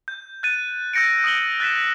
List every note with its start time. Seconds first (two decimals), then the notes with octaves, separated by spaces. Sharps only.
0.08 G6
0.43 F#6 A6 D#7
0.94 E6 G6 A#6 C#7 D7
1.24 D#6 D7 F#7 G7
1.60 F#6 A6 B6 E7